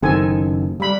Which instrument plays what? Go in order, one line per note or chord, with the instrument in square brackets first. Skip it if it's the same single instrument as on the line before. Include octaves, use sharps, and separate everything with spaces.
[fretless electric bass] F#1 D#3 [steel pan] C4 A4 G#5
[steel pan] G3 B5